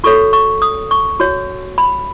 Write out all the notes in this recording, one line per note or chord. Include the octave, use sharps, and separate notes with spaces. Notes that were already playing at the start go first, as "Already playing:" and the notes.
F#4 A4 C#5 C#6
C#6
D#6
C#6
F#4 C#5
B5